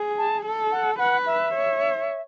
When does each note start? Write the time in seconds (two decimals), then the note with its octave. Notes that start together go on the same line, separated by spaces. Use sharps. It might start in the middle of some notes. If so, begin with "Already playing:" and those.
Already playing: G#4
0.18 A5
0.45 A4
0.72 F#5
0.98 B4 F#5
1.26 E5
1.54 C#5